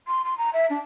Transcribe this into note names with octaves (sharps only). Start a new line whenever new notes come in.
C6
C6
A#5
E5
D4